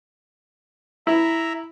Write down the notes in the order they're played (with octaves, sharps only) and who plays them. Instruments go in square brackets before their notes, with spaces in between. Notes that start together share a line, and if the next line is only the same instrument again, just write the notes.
[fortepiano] E4 [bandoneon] E5 A#5